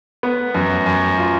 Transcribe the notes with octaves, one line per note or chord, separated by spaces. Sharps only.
B3
F#2
F#2
F4